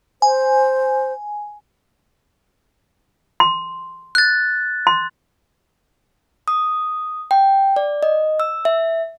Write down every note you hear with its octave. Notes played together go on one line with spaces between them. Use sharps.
C5 G#5
C6
F#6 A6
C6
D#6
G5
D5
D#5
E6
E5